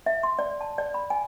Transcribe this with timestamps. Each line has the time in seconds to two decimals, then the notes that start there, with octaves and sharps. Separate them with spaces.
0.06 E5
0.23 C6
0.39 D5
0.61 A5
0.78 D5
0.94 B5
1.10 G#5